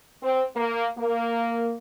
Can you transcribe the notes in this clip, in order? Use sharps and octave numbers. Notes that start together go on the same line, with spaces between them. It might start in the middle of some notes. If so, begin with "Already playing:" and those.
C4
A#3
A#3